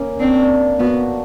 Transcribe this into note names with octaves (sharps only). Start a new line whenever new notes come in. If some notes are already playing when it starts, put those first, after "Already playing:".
Already playing: A#3 C#4
C4 D4
B3 F#4